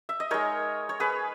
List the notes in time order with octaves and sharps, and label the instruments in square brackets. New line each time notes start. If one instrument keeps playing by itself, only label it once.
[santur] E5
D#5
G#3 D#4 A#4 C#5
C#5
G#4 B4